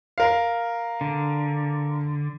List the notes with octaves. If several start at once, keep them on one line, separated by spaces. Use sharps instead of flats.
A#4 F5
D3